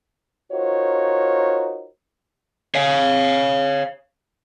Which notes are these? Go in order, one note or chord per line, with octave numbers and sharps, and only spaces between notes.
D#4 F4 F#4 A#4 C5 C#5
C#5 F5